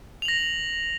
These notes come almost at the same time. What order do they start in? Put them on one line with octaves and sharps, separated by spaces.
F7 F#7 A#6